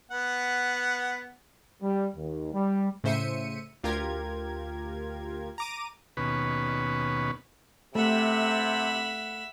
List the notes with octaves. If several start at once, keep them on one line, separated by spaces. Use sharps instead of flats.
B3 F#5
G3
D#2
G3
A2 C#3 C5 E5 C#7 D#7
D2 F4 G4 A#4 G#6
A#5 D6 D#7
D#2 B2 C#4 B4
C3 A3 E5 F#5 B5